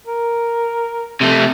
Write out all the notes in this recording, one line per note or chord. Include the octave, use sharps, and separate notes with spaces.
A#4
C3 A3